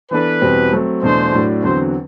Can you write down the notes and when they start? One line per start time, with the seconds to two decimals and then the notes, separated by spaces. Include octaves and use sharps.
0.11 E3 B3 D4 A4 B4
0.41 E2 B2 G3 C4
0.72 F#3 A3 C4
1.02 E2 B2 F#3 A3 D4 C5
1.32 A2 F#3 A3 D4
1.62 E2 D3 F#3 C4 C5